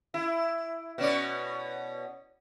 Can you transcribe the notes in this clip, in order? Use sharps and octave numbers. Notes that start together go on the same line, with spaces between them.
E4
B2 C#4 D5